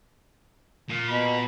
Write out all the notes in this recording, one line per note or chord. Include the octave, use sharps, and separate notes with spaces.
A#2
B2 B5